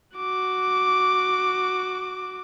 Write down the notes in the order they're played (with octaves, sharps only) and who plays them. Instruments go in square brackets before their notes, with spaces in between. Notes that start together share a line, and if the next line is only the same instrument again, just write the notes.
[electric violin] F#4 D6